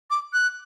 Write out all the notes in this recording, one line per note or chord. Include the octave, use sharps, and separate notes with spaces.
D6
F#6